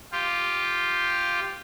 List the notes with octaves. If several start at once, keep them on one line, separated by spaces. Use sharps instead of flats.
F4 G4